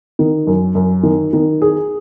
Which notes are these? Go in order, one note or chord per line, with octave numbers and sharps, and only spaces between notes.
D#3
F#2
F#2
D#3
D#3
G#4